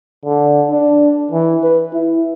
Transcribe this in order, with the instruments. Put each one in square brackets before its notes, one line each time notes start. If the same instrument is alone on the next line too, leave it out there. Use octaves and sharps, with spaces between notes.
[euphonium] D3
D4
E3
B4
E4